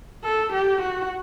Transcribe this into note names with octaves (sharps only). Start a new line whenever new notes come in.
A4
G4
F#4